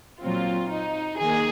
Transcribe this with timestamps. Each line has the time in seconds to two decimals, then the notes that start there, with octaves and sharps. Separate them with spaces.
0.20 A#2 F#3 C4 F4
0.70 D#4
1.18 D#3 A#3 G#4